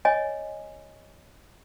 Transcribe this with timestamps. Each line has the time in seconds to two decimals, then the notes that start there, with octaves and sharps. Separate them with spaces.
0.05 C#5 D#5 G#5